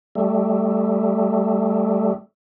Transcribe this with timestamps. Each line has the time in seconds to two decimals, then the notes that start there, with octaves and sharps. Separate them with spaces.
0.15 G3 A3